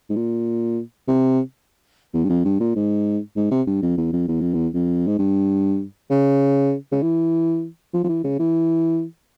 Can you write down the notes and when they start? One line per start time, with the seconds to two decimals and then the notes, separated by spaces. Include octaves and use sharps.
0.10 G#2
0.16 A#2
1.08 C3
2.14 E2
2.24 G2
2.29 F2
2.45 G2
2.60 A#2
2.76 G#2
3.37 G#2
3.51 C3
3.67 G2
3.82 F2
3.97 E2
4.13 F2
4.28 E2
4.41 F2
4.54 E2
4.74 F2
5.08 G#2
5.19 G2
6.10 C#3
6.92 C#3
7.02 E3
7.94 F3
8.04 F3
8.09 E3
8.24 C#3
8.39 E3